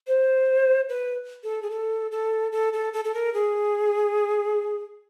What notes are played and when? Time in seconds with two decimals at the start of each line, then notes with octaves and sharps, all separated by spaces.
0.07 C5
0.89 B4
1.43 A4
1.62 G#4
1.70 A4
2.11 A4
2.52 A4
2.73 A4
2.93 A4
3.04 A4
3.14 A#4
3.34 G#4